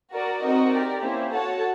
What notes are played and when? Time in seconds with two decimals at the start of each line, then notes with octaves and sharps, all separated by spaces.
0.12 F#4 A#4 D5
0.43 C4 D#4 F#4 A#4 D#5
0.72 G4 A#4 D5
1.02 A#3 C#4 E4 G4 C5
1.32 F#4 A4 C#5 F#5 A5